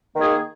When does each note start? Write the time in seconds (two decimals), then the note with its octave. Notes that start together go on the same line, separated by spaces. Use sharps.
0.14 D#3
0.17 A#3
0.20 G#4